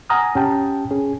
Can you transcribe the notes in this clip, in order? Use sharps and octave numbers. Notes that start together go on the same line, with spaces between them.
F#5 G#5 A#5 D#6 F6
C#4 G4 G5 A5
C#4 G#4